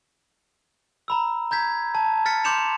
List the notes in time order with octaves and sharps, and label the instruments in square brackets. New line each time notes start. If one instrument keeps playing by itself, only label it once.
[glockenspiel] A#5 B5 E6
A#5 G6 G#6 B6
A5
F6 A6 B6 C#7
C6 D6 G6 C#7 E7 F7